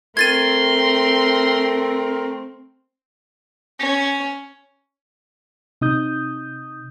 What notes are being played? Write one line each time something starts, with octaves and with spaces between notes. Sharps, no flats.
A3 C4 A#4 C6 G#6 A6 D#7
C#4
C3 D#4 D#6 G6